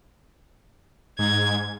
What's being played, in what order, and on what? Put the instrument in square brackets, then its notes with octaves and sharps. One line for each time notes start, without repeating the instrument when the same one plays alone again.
[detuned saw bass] G#2 [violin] G#6